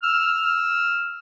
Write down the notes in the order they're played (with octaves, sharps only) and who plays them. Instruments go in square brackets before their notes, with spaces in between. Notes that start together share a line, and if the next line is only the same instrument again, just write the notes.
[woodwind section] E6 F6